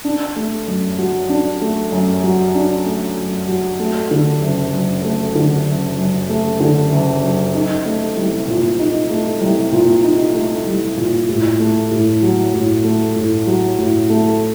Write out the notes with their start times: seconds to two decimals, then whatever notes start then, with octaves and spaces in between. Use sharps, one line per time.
0.05 D4
0.36 A3
0.68 F#2
0.98 F#3
1.29 D4
1.62 A3
1.92 F#2
2.23 F#3
2.55 D4
2.86 A3
3.17 F#2
3.48 F#3
3.80 A3
4.11 D3
4.42 F#1
4.73 F#2
5.04 A3
5.35 D3
5.67 F#1
5.98 F#2
6.29 A3
6.60 D3
6.92 F#1
7.23 F#2
7.54 D#4
7.86 A3
8.17 C2
8.48 A#2
8.79 D#4
9.10 A3
9.41 C2
9.72 A#2
10.04 D#4
10.35 A3
10.66 C2
10.97 A#2
11.28 A2
11.60 A3
11.91 A2
12.22 F#3
12.54 A2
12.84 A3
13.16 A2
13.47 F#3
13.78 A2
14.10 A3